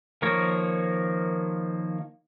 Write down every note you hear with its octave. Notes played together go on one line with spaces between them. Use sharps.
D#3 F3 A#3 A#4 C#5